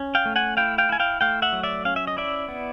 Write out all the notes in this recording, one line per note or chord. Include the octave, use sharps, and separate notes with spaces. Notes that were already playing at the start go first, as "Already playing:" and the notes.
Already playing: C#4
F5 G5
A3
F#5 G#5
E4 F5 G5
F5 G5
E4 G#5
F5 G5
A3 F5 G5
E5 F#5
F#3
D5 E5
C#4 F5
E5
D#5
E4 D5 E5
B3